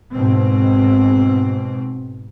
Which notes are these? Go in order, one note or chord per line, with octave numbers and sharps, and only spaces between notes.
G#2 B2 C4